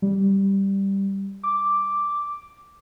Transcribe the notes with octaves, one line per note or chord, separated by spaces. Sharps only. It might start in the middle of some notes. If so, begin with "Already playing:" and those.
G3
D6